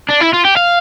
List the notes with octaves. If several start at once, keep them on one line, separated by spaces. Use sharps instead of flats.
D4
E4
F4
G4
F5